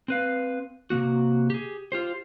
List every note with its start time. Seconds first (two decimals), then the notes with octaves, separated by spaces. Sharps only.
0.08 C4 B4 F5
0.90 C3 D#3 A#3 F#4
1.50 G4 G#4
1.92 F4 G4 C5